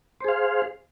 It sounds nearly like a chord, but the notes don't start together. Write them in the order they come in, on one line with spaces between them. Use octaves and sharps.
C5 G#4 F5